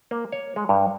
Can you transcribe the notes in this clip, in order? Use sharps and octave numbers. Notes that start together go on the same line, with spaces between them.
A#3
C#5
G#3
G2